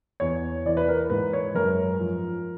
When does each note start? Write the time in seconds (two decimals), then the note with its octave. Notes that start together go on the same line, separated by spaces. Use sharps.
0.20 E2 C#5
0.65 E3 D5
0.77 B4
0.88 A#4
1.10 G#2 B4
1.33 C#5
1.55 F#2 A#4
2.00 F3